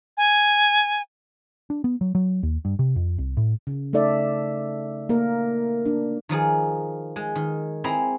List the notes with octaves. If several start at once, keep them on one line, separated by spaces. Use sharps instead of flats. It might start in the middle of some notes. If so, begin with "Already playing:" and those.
G#5
D4
B3
F#3
F#3
D#2
G2
C3
F2
C2
A2
C#3
A3 D#4 A4 D5 E5
A#3 A#4
D4
D#3 F3 D#4 G#4
G#3
D#3
C4 E4 G#4 A#5 B5